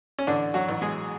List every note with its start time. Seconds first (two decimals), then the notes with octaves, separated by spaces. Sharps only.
0.19 C#4
0.27 A1 D3 D4
0.54 F#3 F#4
0.68 A1
0.81 G#3 G#4